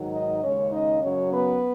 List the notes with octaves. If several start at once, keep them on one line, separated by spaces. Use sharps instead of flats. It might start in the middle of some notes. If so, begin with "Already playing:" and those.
Already playing: G#2 D#3 F#3
D#4 D#5
D#2 C#3 G#3 C#4 C#5
D#4 D#5
F#2 C#3 F#3 C#4 C#5
B3 B4